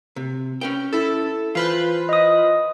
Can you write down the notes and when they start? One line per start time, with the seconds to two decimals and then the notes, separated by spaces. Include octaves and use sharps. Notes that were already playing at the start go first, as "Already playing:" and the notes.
0.16 C3
0.61 C#4 B4 G5
0.93 E4 A4
1.55 E3 F4 B4 C5
2.09 D#5 D#6